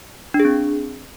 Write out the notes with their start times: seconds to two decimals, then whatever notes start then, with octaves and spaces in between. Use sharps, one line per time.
0.34 D4
0.40 G#4
0.45 C4